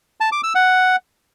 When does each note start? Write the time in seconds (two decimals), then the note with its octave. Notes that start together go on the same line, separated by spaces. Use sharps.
0.20 A5
0.32 D6
0.43 E6
0.55 F#5